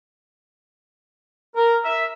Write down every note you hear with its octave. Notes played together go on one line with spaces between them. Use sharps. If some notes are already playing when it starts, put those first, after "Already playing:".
A#4
E5